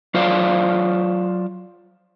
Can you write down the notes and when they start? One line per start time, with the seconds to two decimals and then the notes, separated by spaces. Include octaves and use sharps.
0.14 F#3 F4 C5 D5 F5